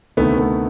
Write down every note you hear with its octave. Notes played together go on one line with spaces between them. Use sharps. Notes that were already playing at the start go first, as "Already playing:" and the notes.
D2 C3 D#3 A3 B3
A3 B3